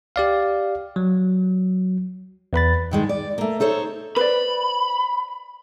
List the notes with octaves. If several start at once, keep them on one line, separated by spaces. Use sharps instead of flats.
G4 D5 F5
F#3
E2 B4 B5 A6
G2 D#3 G#3
D5
A3 A#3
D#4 A4 C5 C#5
B4 C5 D5 B5